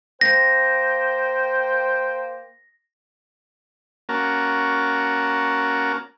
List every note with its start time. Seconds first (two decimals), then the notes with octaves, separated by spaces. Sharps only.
0.21 A#3 C5 G5 A#6
4.09 A#3 C#4 F#4 A#4 A5